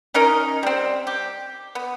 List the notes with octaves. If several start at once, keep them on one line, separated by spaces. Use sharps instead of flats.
C#4 D#4 A#4 D#5
G3 C4
G4
B3